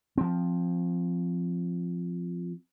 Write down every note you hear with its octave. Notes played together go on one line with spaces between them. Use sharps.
F3 C4